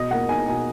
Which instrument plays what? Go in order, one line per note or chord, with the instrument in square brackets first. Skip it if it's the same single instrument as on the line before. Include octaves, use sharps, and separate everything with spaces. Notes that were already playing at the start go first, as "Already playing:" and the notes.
Already playing: [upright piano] B2 D#5
A#3 F#5
D#4 G#5
B2 G#5